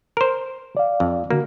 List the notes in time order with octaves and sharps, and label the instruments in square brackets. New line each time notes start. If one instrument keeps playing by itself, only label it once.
[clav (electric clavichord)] A#4 C5
[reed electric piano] D5 F5
[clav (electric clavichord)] F2
[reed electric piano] D3 F#4 [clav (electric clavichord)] A#3